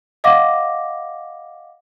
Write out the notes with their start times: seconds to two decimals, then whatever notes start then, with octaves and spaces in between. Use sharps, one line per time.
0.24 D#5 F5 F#5 D6 A#6